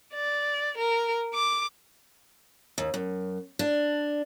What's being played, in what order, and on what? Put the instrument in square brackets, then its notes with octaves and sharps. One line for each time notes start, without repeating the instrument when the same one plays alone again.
[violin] D5
A#4
D6
[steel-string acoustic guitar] D#2
F#2
D4